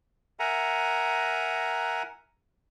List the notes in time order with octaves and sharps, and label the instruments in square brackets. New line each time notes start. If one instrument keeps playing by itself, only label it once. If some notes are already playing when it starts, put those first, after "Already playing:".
[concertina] A#4 E5 F#5 G#5 A#5